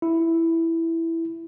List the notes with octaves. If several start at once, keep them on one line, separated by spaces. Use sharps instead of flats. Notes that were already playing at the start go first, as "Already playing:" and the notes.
E4